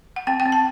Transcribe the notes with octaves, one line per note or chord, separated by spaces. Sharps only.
F#5
C4 G5
G5
C4
A5